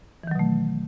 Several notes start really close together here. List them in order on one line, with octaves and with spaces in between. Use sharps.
E3 D#3 F#3 B2 A3